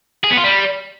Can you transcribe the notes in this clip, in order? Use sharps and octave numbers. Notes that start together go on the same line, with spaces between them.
G#4
B3
F4
G3